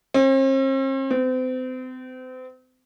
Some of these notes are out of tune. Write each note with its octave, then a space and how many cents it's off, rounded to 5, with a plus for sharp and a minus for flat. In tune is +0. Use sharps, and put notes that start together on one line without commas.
C4 +45
C4 -35